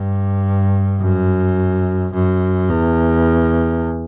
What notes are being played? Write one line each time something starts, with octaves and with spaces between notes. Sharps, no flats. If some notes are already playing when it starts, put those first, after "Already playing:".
Already playing: G2
F#2
F#2
E2